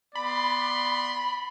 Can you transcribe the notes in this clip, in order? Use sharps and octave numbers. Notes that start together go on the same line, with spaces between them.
B3 D5 B5 C6